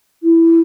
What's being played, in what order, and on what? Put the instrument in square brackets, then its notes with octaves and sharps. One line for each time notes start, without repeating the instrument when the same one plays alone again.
[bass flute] E4